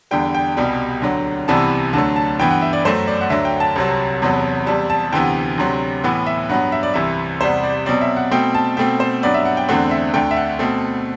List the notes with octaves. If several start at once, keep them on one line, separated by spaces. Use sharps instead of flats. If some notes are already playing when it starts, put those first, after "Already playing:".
E2 D3 G3 G5
G5
C2 B2 G3
D2 D3 F#3
C2 C3 E3 G3 B3 A5
D2 D3 F#3 A3 A5
A5
G2 E3 B3 G5
F#5
E5
D5
F#2 F#3 A3 C5
D5
F#5
D2 D3 F#3 E5
G5
A5
C2 C3 F#3
E2 C3 F#3 B3
E2 C3 G3 A5
A5
D2 C3 E3 B3 G5
D2 C3 F#3
A2 E3 B3 F#5
E5
G2 F#3 B3 F#5
E5
D5
C2 C3 E3 E5
E2 C3 G3 B3 C5
D5
B2 F#3 C4 D5
E5
F#5
B2 A3 C4 G5
A5
B2 A3 C4 G5
C5
G2 F#3 B3 D5
E5
F#5
G5
E2 D3 A3 C4 F#5
E5
D2 D3 A3 G5
E5
F#5
B2 A3 C4